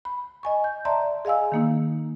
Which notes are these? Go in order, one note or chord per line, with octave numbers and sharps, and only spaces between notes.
B5
D#5 G#5 C#6
G6
D5 E5 A5 A#5 C6
G#4 D#5 F5 G#5 E6
D#3 A#3 D#4